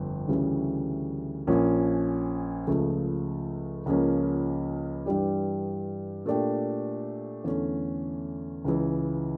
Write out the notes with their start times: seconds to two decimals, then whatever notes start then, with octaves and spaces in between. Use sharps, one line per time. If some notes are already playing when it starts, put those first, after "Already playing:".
Already playing: G1 F2
0.28 D2 C#3 E3 G3 C#4
1.47 A#1 A#2 F3 C#4
2.67 C#2 C#3 F3 A3
3.86 C#2 C#3 F3 A#3 C#4
5.06 G2 E3 G3 D4 G4
6.26 A#2 A3 D4 G4
7.44 E2 D3 A3 C#4
8.65 C#2 C#3 E3